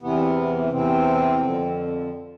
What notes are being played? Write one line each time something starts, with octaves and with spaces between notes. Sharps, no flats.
E2 C3 E3 B3
E2 C3 E3 C4
F2 D3 F3